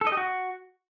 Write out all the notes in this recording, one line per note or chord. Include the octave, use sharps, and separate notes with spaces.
A4
D#5
G4
F#4